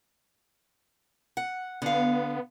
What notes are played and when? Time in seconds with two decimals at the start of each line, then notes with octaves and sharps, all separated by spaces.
1.37 F#5
1.82 D3 B3 F5